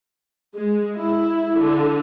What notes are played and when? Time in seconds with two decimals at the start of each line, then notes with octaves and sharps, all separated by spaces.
0.56 G#3
0.98 E4
1.58 D3